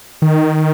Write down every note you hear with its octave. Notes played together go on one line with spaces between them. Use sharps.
D#3